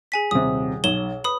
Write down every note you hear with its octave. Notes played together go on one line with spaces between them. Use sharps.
G#4 G#5 B6
D#1 C3 D#6
B1 C#5 E7 G7
B4 B5 D#6